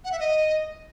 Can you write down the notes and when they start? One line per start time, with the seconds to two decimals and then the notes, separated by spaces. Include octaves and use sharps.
0.04 F#5
0.12 E5
0.20 D#5